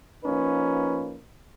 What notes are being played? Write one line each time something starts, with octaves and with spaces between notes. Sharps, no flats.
F3 A#3 C#4 D#4 B4